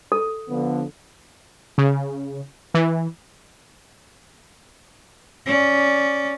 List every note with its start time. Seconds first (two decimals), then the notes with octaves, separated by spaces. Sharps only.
0.12 A4
0.48 D3 F3 B3
1.78 C#3
2.74 E3
5.46 C#4 D5